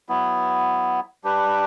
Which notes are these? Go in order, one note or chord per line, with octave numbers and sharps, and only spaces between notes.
F#3 B3 E4
G3 D4 G4 B4